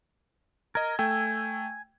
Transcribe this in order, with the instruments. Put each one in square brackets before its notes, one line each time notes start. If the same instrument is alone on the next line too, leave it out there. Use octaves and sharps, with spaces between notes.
[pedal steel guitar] A#4 [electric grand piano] D#5 G#6
[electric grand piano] A3 G5 E6 [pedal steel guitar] G#5